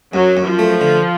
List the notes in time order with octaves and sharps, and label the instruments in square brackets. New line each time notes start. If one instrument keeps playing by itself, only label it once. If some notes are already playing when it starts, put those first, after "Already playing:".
[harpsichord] F#2 [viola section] F#3
[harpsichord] F#2
[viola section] F3
[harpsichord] A3
D3